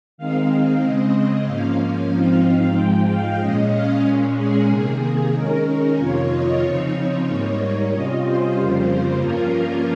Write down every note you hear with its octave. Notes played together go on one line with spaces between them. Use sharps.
D#3 G#3 C4 D#4 F5
C#3 G#3 C4 D#5
D#5
G#2 F3 A#3 C#4 F5
G#2 F3 C4 D#4 F5
F5
G#2 F3 G#3 G5
F5
A#2 G#3 C#4 D#5
F5
A#2 G#3 C#4
G#4
C3 D#3 A#3 G#4
D#3 G#3 C#4 A#4
F2 C3 D#3 A#3 F4 C#5
D#5
C#3 F3 C4 D#4 C#5
C#5
G#2 G3 A#3 D#4
C3 G3 C#4 F4 D#5
C5
F2 C#3 G3 A#3 F4
G2 F3 A#3 C#4 F4 A#4